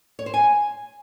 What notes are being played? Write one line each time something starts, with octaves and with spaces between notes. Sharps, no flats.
C#5
C5
G#5